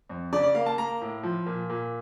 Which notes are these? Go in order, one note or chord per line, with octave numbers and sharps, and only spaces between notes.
F2
C#3 D5
D5
A#3 F5
A5
A#3 A#5
A2
F3
A#2
A#2